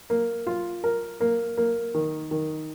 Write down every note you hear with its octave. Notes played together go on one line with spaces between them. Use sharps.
A#3
F4
A#4
A#3
A#3
D#3
D#3